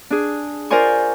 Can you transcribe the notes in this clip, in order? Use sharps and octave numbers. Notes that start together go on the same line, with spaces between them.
D4 G#4
F4 A#4 C5 D5 G#5 C#6